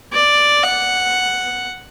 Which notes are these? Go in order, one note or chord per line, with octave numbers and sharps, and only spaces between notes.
D5
F#5